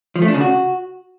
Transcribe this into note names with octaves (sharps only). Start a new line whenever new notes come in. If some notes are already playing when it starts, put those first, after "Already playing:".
F3
A3
D4
C#3
F#4